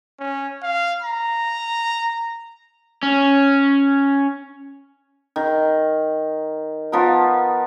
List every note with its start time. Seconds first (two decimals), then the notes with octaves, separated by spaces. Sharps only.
0.19 C#4
0.62 F5
1.02 A#5
3.03 C#4
5.36 D#3
6.92 F3 B3 A#4